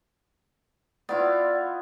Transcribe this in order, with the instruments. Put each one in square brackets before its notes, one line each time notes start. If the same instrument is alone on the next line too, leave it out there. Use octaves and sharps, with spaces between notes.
[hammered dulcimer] B3 E4 F4 [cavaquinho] D5